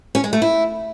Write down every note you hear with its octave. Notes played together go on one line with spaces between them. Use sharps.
C#4
G#3
A3
E4